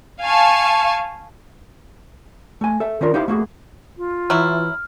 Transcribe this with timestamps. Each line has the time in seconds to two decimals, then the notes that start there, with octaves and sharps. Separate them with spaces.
0.20 F5 G#5 A5 C#6
2.61 A3 G#5
2.80 A4 E5
3.01 D#3 C#4 D4 F4 A#4
3.14 D#4 E4 G4 C5 F5
3.28 A3 A#3 F#4 G#4
3.97 F4
4.30 E3 F#3 E4 F6